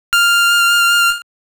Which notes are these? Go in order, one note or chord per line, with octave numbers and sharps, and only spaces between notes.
F6